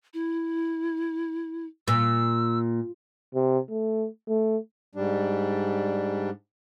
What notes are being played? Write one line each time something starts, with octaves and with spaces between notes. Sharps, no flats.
E4
A#2 E6
C3
A3
A3
G#2 G3 D4